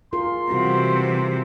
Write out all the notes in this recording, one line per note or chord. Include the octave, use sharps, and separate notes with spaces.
F4 G#4 A#4 C6
C3 E3 G3 F4 F#4